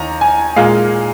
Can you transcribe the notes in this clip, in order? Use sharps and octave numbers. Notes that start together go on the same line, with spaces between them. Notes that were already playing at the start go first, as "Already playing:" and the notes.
Already playing: D#2 A#5
G#5
A#2 G#3 F5